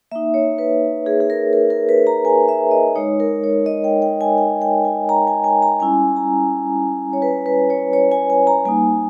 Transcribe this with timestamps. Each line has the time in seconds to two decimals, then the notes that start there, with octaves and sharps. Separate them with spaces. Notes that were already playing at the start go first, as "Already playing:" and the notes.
0.11 A#3 D#4 E5
0.34 C#5
0.58 B4
1.06 G#4
1.20 G#4
1.30 A#4
1.53 A#4
1.70 A#4
1.89 B4
2.07 A#5
2.25 G#5
2.49 E5
2.71 D#5
2.96 G#3 D#4 C#5
3.20 A#4
3.44 C#5
3.66 D#5
3.84 G5
4.02 G5
4.21 G#5
4.38 G5
4.62 G5
4.85 G#5
5.09 A#5
5.27 G#5
5.44 G#5
5.62 A#5
5.80 G3 C#4 E4 G#5
6.16 A#5
7.13 C#5
7.22 B4
7.46 B4
7.70 C#5
7.93 C#5
8.12 G#5
8.30 G#5
8.47 A#5
8.65 G3 A#3 D#4 G#5